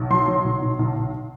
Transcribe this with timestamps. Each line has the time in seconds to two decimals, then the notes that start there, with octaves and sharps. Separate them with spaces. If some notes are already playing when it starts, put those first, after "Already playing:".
Already playing: B1
0.10 F#3 C6
0.28 F#3
0.44 B1
0.61 B1
0.79 B1
0.96 B1